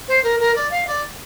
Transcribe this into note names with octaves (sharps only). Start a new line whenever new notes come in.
C5
A#4
A#4
D5
F5
D5